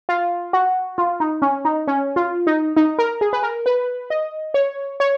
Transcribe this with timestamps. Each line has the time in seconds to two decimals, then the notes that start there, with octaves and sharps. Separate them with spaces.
0.09 F4
0.53 F#4
0.98 F4
1.20 D#4
1.42 C#4
1.65 D#4
1.88 C#4
2.16 F4
2.47 D#4
2.77 D#4
2.99 A#4
3.21 G#4
3.33 B4
3.43 A#4
3.66 B4
4.10 D#5
4.54 C#5
5.00 C#5